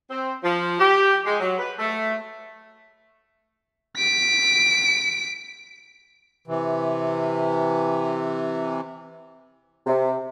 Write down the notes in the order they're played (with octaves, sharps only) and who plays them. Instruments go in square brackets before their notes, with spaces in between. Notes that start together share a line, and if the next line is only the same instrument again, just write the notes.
[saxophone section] C4
F3
G4
G#3
F#3
B4
A3
[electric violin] B6 D7
[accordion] C3 E3
[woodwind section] C3